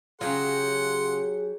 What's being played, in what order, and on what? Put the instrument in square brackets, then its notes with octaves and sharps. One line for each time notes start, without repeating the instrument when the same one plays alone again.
[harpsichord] C#3 F4 [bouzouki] F#3 G4 [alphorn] G#4 [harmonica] F#5 C6